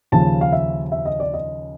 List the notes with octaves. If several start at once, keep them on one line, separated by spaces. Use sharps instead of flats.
D#2 C#3 F3 A5
F5
E5
E5
D#5
D5
D#5